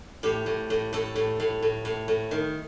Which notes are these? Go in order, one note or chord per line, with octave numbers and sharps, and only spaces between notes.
A2 G4
A2
A2
A2 A4
A2
A2
A2
A2
A2
D#3